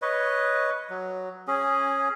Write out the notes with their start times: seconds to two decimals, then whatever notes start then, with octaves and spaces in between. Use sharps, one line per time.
0.02 B4 C#5 D#5
0.90 F#3
1.48 C#4 G#4